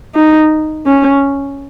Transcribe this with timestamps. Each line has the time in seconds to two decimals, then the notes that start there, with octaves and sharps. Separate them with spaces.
0.15 D#4
0.86 C#4